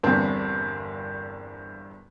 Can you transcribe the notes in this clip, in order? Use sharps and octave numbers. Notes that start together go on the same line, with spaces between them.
G1 E2 G2 A#3 C4 A5